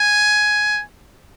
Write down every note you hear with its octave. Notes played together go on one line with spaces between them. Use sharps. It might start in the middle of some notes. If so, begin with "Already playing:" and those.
Already playing: G#5